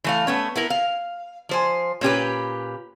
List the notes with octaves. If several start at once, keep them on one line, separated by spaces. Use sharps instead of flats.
E3 A3 F5
A3 B3 C#4
B3 E4 A#4
F5
F3 C5 G#5
A#2 C#4 G4 B4